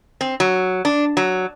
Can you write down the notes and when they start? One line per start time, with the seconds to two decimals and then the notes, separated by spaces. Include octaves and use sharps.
0.21 C4
0.40 F#3
0.85 D4
1.17 F#3